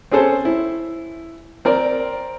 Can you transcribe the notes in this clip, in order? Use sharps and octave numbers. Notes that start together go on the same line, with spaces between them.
C4 C#4 G#4 A4 C5
E4
C4 A#4 D5